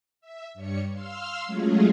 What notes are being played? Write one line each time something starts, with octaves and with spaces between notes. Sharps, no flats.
E5
G2 G3 C#5 C#7
F5 C6 E6 F6
F#3 G#3 A3 C#4 F4 G#4